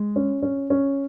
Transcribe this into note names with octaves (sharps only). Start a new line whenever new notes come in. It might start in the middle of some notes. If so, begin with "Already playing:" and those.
Already playing: G#3
C#4
C#4
C#4